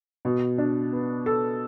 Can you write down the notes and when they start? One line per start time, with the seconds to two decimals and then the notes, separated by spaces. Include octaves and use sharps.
0.25 B2
0.58 D4
0.93 B3
1.26 A4